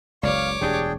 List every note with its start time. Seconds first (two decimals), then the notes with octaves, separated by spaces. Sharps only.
0.23 F#1 C#2 B4 C#5 D5 F5 D6
0.61 E1 D2 B2 D4 G4 G#4 G5